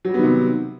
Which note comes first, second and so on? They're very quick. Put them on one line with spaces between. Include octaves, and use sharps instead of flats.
F#3 G3 B3 D#3 C3